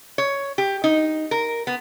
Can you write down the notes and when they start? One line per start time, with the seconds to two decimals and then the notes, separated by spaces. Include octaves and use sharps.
0.18 C#5
0.58 G4
0.84 D#4
1.31 A#4
1.67 B3